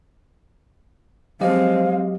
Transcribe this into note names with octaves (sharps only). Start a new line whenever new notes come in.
F3 F#3 G#3 C4 G4 D#5 F5